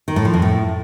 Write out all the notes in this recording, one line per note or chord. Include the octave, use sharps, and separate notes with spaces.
D#3
A2
F3
F2
A2